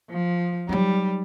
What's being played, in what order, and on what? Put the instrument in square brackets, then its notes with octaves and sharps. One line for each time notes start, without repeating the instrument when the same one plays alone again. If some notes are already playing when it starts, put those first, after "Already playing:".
[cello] F3
[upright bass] F#3 D#4 [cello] G3